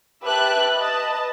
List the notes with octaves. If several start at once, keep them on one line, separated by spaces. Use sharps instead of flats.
G4 B4 E5 A5 F#6
B4 D#5 A5